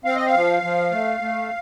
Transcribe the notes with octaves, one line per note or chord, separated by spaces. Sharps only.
C4 F5
D#5
F5
F3
F3
A3
A3